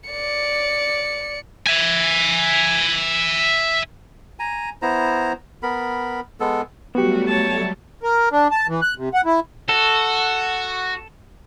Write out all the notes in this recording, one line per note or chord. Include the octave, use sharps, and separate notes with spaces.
D5 C#7
E5 G#5
G#5 A#5
B3 E4 C5 A#5
B3 A#4 B5
G#3 B3 A4
F#3 G3 A3 B3 F#4 G4
C#5 A5
A#4
D4
A5
E3
F#6
C3
F#5
E4
F#4 A4